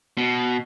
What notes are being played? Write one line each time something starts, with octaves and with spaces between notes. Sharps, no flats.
B2